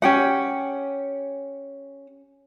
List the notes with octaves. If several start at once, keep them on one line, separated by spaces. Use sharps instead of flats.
C#4 G4 F#5